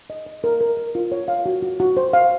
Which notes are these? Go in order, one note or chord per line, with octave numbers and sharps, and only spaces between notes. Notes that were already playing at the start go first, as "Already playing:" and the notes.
D#5
D#5
A#4
A#4
A#4
F4
C#5
F5
F#4
F#4
F#4
C5
F5